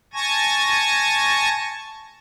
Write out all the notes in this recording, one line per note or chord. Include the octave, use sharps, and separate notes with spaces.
G#5 A5 C#6 G#6 A#6